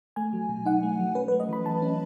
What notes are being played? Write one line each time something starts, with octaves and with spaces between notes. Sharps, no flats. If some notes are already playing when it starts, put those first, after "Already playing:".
A3 G#5
F#3
B2
D#4 F#5
A3
F#3
C#4 B4
B4
A3
D#5
E3 B5
E3 A5
C#4